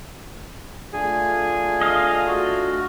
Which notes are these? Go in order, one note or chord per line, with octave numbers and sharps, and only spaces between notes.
A3 D4 F4 G#4
D#5 F5
F#4